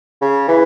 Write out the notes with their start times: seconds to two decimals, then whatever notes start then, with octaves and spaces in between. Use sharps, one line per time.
0.22 C#3
0.48 E3